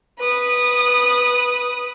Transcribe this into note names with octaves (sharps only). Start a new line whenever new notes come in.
B4 D#6